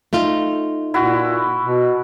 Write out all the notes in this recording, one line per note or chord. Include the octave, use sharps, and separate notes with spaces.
A3 D#4 F4
A#2 E4 F#4
B2